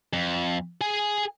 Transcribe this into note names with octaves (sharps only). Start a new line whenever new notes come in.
F2
G#4 G#5